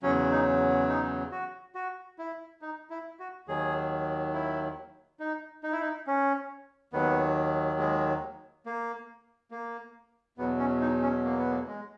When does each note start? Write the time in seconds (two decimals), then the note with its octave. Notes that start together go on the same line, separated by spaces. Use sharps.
0.02 E2 C#3 F#3 C#4
0.31 D#4
0.89 D#4
1.31 F#4
1.75 F#4
2.19 E4
2.62 D#4
2.90 E4
3.19 F#4
3.48 D#2 D#3 F#3 G#4
4.33 E4
5.20 D#4
5.63 D#4
5.72 E4
5.81 D#4
6.07 C#4
6.93 D#2 D#3 F#3 B3
7.79 G#3
8.66 A#3
9.51 A#3
10.38 E2 B2 F#3 B3
10.59 C#4
10.81 D#4
11.02 C#4
11.25 A#3
11.38 B3
11.51 A#3
11.68 G#3